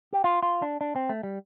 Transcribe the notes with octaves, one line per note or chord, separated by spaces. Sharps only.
G4
F4
F4
D4
D4
C4
A3
G3